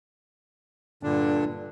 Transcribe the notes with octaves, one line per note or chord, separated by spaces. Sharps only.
G2 A#2 D3 D4